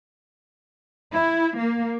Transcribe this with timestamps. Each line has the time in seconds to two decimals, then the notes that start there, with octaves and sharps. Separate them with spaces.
1.12 E4
1.57 A#3